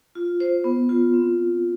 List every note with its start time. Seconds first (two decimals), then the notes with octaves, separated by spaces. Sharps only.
0.15 F4
0.40 C5
0.64 B3
0.89 F4
1.14 C4